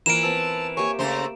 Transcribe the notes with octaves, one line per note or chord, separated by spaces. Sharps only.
E3 F3 A#3 A#4 D7 E7
B3 C4 A5 E6
A#3 G4 C#5 E5 G#5 C#6
C#3 A3 C5 A#5